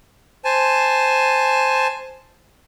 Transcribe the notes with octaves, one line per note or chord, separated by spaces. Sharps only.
C5 G#5 A5